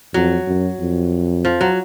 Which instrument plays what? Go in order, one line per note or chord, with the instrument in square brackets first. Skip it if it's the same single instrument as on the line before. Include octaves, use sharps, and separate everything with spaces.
[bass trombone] F2 [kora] F#3
[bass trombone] F#2
F2
[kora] F3
F#3